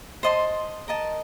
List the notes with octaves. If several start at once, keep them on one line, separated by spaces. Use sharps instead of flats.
C5 D#5 A5 C6
A#4 D#5 A5